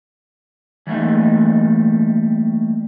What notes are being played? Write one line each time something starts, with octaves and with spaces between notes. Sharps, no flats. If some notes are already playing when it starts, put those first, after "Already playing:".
E3 G3 A3 A#3 D#4